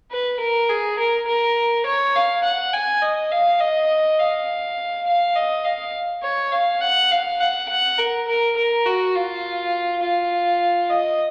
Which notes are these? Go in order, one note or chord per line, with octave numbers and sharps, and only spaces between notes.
B4
A#4
G#4
A#4
A#4
C#5
F5
F#5
G#5
D#5
F5
D#5
F5
F5
D#5
F5
C#5
F5
F#5
F5
F#5
F#5
A#4
A#4
A#4
F#4
F4
F4
D#5